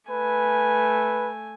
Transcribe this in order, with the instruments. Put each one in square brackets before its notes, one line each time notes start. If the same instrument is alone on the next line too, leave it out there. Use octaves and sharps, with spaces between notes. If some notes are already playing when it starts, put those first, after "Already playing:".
[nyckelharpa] A3 G#5 [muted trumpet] B4